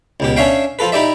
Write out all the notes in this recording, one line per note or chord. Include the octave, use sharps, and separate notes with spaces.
C#2 B2 G4
C#4 D4 C#5 E5 F5 G5
F3 F4 A4 B4
D#4 E4 G4 D5 E5